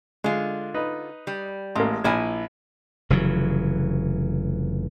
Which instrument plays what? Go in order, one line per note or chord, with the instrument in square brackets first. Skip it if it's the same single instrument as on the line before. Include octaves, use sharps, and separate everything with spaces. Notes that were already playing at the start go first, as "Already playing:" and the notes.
[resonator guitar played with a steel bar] D3 F4 [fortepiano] G#3
[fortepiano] D#4 B4
[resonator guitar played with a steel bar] G3
[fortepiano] A1 A#3 [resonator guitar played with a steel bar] G#3
[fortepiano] A#1 [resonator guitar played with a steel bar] A#3 E4 G#5
[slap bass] F1 C#3 E3 F#3